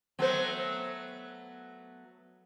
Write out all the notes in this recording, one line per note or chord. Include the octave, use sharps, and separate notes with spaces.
F#3 A3 B3 C4 C5